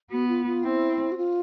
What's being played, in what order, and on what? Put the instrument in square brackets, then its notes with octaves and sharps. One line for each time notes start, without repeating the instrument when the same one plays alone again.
[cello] B3 [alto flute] F#4
[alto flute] F4
F4
[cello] C4 [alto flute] E4
[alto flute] F#4
F4